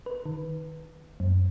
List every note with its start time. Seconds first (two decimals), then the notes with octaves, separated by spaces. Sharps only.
0.06 B4
0.26 D#3
1.20 F#2